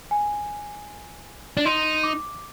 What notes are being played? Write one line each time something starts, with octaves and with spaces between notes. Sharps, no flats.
G#5
D4
D#4 C6
D6